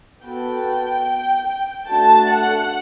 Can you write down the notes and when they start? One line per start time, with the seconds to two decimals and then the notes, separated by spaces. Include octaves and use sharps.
0.24 B3 F#4 A4 G5
1.89 A3 D4 F#4 A5
2.30 F#5